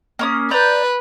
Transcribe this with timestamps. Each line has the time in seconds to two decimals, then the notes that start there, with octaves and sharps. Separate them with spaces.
0.19 A#3 C#4 D#6
0.51 B4 D5 A#5 G6